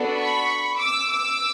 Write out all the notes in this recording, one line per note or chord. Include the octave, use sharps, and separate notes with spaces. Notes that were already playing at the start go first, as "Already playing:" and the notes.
Already playing: B3 D4 F#4 A4
B5 C#6
D6 E6
D6 E6